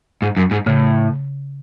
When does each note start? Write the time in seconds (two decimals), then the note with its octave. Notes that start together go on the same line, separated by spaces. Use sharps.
0.22 G#2
0.37 F#2
0.51 G#2
0.66 A2 C#3